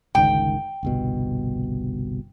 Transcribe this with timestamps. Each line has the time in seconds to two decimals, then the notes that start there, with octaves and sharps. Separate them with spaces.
0.15 G1 C#2 D#3 G5
0.83 G1 C2 B2